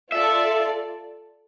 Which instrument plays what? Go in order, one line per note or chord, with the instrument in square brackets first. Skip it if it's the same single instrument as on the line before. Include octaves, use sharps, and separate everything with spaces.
[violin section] F4 A4 D5 [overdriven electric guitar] E5